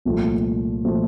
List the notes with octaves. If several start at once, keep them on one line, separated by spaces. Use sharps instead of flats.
C2 A#2 F3 A3
A#2 F3 A3